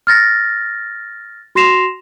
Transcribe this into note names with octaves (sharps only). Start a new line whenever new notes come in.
F6 A6 A#6
F#4 C6 A#6 C7 E7 F7